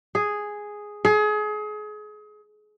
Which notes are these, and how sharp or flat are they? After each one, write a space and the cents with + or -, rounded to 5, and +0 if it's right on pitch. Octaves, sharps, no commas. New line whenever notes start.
G#4 +0
G#4 +30